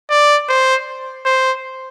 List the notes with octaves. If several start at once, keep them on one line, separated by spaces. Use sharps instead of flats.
D5
C5
C5